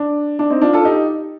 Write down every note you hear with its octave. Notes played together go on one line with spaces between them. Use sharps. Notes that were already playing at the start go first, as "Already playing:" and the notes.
Already playing: D4
D4
C4 D#4
D4 F4
F4 A4
D#4 G4